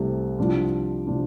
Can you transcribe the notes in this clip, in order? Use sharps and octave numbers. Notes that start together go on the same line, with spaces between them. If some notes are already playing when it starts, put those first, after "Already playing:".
Already playing: C2 C3 A3
C2 C3 F3 D4 F4
C3 F3 D4 F4